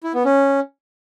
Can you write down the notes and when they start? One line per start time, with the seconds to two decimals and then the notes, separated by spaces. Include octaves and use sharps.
0.03 E4
0.14 B3
0.25 C#4